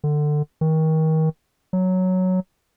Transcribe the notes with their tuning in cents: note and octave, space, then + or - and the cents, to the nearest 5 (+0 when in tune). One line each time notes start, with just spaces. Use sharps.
D3 +20
D#3 +30
F#3 +0